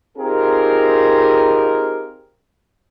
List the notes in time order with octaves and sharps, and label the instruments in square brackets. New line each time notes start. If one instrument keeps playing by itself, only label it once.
[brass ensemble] C4 D#4 F4 G4 G#4 A#4